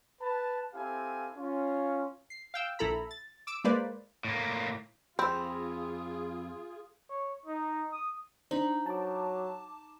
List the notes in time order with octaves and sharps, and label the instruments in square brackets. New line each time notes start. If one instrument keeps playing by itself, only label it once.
[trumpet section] B4 A5
C4 E4 G4 A4 F5 G#5
C#4 F4
[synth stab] C7
F5 G5 E6
A#1 E4 A4 A#5 B5
A6
D6 E6 D7
G#3 A#3 B4 C5 D5
[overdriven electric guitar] A2 A#3
[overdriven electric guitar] F2 [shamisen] C4 [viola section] F4 G#4 [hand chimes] B5 E6
[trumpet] C#5
D#4
D#6
[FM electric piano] D4 C5 [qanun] D#4 B5
[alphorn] F#3 [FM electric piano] A5 D6